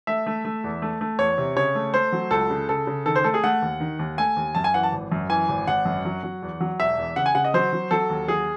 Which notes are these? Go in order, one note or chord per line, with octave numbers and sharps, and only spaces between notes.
A3 E5
A3
A3
E2
A3
A3
E2 C#5
C3
C#3 C#5
A3
A3 C5
F#3
C#2 A4
C#3
C#3 A4
C#3
D#3 A4
C5
A3 A4
G#4
A3 F#5
D#2
D#3
D#2
A3 G#5
D#2
F#2 A5
G#5
E3 F#5
A5
G#1
F#2
E3 G#5
G#1
G#1 F#5
F#2
F#3
F#3
E2
F#3
E1 E5
E2
C#3 F#5
G#5
C#3 F#5
D#5
F#3 C5
F#3
F#3 A4
D#2
F#3 G#4